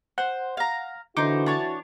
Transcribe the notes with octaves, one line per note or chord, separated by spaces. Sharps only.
C5 F#5
F5 A#5
D3 E3 D#4 E4 F#4 C5 D6
D4 C#5 A5